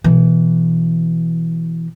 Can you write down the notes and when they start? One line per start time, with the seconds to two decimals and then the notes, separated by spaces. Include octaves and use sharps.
0.04 B2 E3